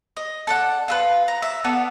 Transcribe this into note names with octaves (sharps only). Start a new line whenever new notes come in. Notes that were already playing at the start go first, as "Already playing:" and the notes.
D#5
A4 D5 F#5
F4 A4 B4
A#5
E5
B3 A4 D5